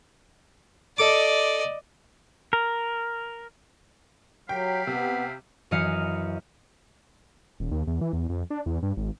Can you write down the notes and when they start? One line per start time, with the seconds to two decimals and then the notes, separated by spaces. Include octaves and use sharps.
0.98 A4 D5 D#5 D6
2.53 A#4
4.49 F#3 G4 F5 G5 B5
4.87 C3 B3
5.71 F#2 E3 D#5 F5 C#7
7.60 D#1
7.71 D#2
7.87 E2
8.01 E3
8.13 E2
8.29 F2
8.50 D4
8.66 E2
8.83 G2
8.97 G#1